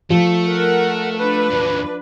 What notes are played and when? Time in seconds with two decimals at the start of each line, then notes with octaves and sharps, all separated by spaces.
0.10 F3 A3
0.49 A#4 F#5
1.17 D4 B4
1.51 D#2 F#3